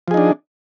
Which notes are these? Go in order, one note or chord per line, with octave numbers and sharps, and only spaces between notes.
F3 D4 D#4 G#4